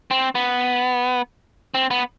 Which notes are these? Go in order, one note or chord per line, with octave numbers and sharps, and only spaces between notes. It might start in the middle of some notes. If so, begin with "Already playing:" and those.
C4
B3
C4
B3